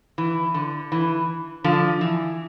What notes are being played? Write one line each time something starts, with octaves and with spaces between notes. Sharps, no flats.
E3
D3
E3
D3 F3
E3